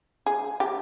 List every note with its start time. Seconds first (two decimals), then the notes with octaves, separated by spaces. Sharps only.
0.26 G#4
0.60 G4